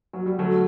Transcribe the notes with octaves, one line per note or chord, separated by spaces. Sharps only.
F#3
G3
D3 F#3 A3